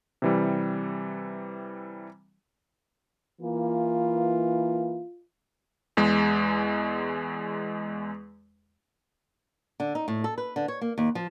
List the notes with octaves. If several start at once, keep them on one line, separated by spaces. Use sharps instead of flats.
C3 E3 G3
E3 A#3 F4
E2 G#3
D3
D#4
A2
A4
B4
D3
C#5
A#3
D#2
F3